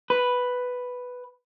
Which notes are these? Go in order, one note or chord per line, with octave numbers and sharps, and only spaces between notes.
B4